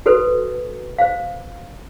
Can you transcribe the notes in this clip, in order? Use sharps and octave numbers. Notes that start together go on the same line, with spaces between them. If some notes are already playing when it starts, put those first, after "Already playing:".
F#4 A4 B4 C5
C5 F5